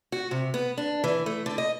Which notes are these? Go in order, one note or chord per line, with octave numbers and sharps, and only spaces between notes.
F#4
C3
B3
D4
E3
A3
D3
D#5